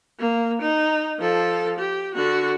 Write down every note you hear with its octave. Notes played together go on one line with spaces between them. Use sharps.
A#3
D#4
F3 A4
G4
D3 F#4